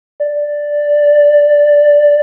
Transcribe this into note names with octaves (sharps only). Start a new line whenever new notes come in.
D5